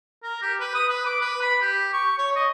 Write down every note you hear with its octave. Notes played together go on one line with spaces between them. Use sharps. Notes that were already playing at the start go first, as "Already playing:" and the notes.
A#4
G4
B4
D#6
B4
D6
B4
B5
G4
C#6
C#5
D#5